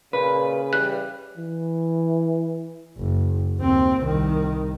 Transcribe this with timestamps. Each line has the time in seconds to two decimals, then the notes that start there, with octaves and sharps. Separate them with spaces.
0.13 A#2 C#3 B4
0.73 E3 G3 F#6
1.38 E3
2.97 F#1
3.57 D#2 C4
4.02 C2 D#3